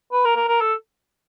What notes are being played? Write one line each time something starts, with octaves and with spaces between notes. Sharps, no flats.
B4
A#4
A#4
A#4
A4